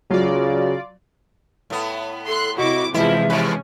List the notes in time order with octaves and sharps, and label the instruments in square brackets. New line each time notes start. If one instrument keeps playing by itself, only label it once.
[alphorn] C#3 [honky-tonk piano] F#3 [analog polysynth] F4 D5
[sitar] A2 B3
[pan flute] A4 [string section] C6 F#6
[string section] C3 E4 D6 [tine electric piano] F#4 C#6 [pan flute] D#5
[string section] E2 C3 F3 [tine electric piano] E3 G#3 [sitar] E4 [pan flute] E5
[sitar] B2 F3 B4 [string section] C#4